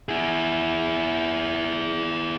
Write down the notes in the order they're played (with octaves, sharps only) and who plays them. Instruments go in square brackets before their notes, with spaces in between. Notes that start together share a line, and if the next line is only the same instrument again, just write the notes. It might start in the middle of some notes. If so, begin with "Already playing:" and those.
[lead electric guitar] E4 G#4